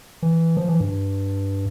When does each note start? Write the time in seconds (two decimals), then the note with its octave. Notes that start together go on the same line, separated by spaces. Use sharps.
0.22 E3
0.57 F3
0.68 E3
0.80 G2